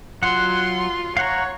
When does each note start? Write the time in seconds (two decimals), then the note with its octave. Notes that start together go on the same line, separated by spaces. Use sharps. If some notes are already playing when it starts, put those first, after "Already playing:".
0.22 F#3 F4 F#5 C6
1.17 C#5 F5 F#5 A#5